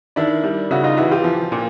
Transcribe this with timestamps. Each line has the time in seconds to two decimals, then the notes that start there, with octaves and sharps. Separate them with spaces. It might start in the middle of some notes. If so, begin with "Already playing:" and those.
0.16 D#3 D4 E4
0.44 G3
0.71 C#3 E4 F#4
0.84 D#4 F4
0.97 E3 E4 F#4
1.11 F4 G4
1.24 F3
1.52 A#2